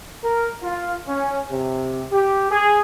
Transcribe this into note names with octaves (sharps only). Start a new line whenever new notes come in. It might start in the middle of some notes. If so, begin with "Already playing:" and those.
A#4
F4
C#4
C3
G4
G#4